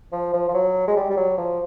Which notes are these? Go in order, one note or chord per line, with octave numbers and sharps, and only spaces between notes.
F3
F3
F3
F#3
G#3
G3
G3
F#3
F3